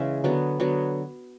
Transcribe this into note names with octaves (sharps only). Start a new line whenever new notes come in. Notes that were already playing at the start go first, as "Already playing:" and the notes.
Already playing: C#3 E3 G#3 E5
D3 F#3 B3
D3 F#3 B3